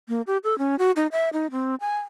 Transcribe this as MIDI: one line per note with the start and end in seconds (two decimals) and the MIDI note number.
0.09 0.22 58
0.27 0.37 67
0.44 0.58 69
0.58 0.76 61
0.79 0.91 66
0.96 1.07 63
1.12 1.29 76
1.33 1.47 63
1.51 1.75 60
1.80 1.97 80